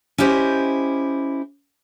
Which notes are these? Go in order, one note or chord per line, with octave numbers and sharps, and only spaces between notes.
C#4 E4 G4 C5 D#5